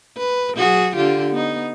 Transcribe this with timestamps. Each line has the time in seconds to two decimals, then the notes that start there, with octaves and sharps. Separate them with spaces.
0.17 B4
0.57 F#3 F#4 G#4
0.96 D3 F4 G4
1.32 B3 D#4